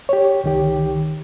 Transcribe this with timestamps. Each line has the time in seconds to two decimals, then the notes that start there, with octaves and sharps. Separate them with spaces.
0.09 G4 C#5
0.44 C2 D#3 G4